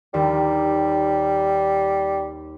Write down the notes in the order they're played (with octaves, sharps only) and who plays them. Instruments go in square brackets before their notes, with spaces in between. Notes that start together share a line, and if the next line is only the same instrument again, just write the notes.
[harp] D#2 [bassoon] G3